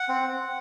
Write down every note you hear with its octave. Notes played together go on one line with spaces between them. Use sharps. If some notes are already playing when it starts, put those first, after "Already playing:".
Already playing: F#5
C4